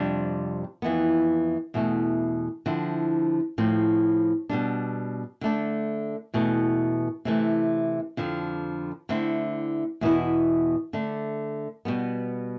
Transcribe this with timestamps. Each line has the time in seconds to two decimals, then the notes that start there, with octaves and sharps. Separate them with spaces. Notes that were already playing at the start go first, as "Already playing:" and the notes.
Already playing: F2 C3 G3 D4
0.82 F2 E3 B3
1.74 E2 B2 A3
2.66 D3 F3 C4 E4
3.58 A2 F3 C4
4.49 B2 G3 D4
5.41 D3 A3 D4
6.34 E2 B2 A3
7.25 C3 E3 A3
8.17 F2 D3 F3
9.09 D3 A3 C4 E4
10.01 E2 B2 B3 E4
10.93 D3 A3 D4
11.85 B2 G3 B3